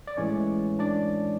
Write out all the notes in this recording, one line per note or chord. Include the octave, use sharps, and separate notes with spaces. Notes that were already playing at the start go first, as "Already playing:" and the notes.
D5
A2 E3 G#3 C#4 C#5
D4 D5